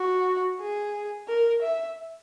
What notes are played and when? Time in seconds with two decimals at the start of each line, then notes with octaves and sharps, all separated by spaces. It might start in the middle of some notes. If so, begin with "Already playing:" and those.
Already playing: F#4
0.60 G#4
1.28 A#4
1.62 E5